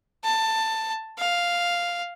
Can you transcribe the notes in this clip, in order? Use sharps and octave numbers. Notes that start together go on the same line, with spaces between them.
A5
F5